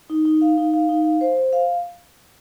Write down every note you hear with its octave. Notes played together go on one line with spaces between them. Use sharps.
D#4
D#4
F5
D#4
F5
D#4
F5
C5
C5
F5